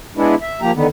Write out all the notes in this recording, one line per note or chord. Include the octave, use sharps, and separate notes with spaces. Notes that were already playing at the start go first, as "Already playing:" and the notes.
G#3 B3 D4 E4
E5
F3 A#3 G4 A#5
D3 D#3 B3